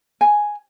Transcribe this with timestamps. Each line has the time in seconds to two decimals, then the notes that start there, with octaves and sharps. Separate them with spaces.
0.21 G#5